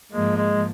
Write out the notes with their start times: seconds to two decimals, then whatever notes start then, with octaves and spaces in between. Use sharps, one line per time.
0.12 G#2 F3 G#3 A#3
0.37 G#3